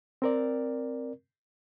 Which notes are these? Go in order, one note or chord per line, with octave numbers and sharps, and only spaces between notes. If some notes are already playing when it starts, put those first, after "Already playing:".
C4 A#4 D5